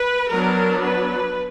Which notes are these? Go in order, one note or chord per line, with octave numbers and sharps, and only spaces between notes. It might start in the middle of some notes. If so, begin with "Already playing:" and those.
Already playing: B4
F#3 B3 D4 A#4
B4